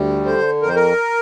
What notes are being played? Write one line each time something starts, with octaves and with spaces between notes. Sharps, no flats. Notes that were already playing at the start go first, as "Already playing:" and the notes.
Already playing: D2 G3
D3 C5
F2 A#4
C5
A#4